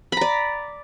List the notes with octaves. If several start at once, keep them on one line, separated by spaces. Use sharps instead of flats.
D5 A#5 B5